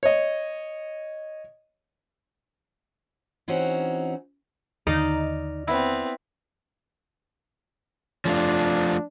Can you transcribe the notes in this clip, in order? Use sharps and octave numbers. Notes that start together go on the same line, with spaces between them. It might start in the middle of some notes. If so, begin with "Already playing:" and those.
C#5 D#5
E3 C4 C#4 D#4 F#4
D#2 D3 D#3 D#4 D5 D#5 F5
B3 C4 E4
F3 A3 D4 F4